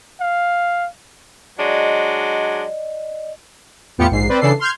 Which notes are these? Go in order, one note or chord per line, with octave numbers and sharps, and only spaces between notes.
F5
F#3 G#3 D4 D5 D#5
E2 A2 B3 F4 G4 C#7
A#1 G#2 C7
C4 B4 C5 D5
C#3 E3 D4 A4 C7
C6 F6 G6 G#6